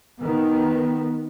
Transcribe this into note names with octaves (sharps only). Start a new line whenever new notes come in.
D#3 B3